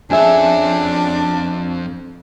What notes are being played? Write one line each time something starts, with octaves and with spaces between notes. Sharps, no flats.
F2 C#4 D4 G#4 A4 E5